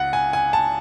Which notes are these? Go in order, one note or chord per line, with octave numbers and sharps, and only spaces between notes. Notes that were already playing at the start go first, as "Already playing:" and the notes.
Already playing: C#2 F#5
G#5
G#5
A5